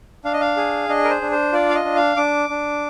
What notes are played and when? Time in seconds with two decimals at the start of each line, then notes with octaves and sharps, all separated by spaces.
0.24 D4 F5
0.33 D#5
0.40 F5
0.57 G#4
0.89 D4 D#5
1.04 A#4
1.10 C5
1.22 D4
1.32 C5
1.53 F4 D5
1.69 F5
1.75 D#5
1.85 D4
1.96 F5
2.16 D4 D6
2.49 D4